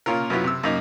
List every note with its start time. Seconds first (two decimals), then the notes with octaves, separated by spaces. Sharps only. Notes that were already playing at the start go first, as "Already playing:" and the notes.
0.06 A#2 C#4 F4 A#4
0.30 F#2 F#3 B3 C#4 E4 F4
0.44 C3 E6
0.63 F#2 A#3 D#4